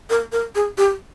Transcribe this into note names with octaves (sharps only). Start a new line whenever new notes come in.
A#4
A#4
G#4
G4